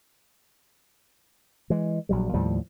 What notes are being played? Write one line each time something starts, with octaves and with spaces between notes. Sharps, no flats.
E3 G#3
A#1 F#3 G3
D#2 A2 F3 G3